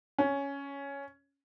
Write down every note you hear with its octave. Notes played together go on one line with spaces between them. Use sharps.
C#4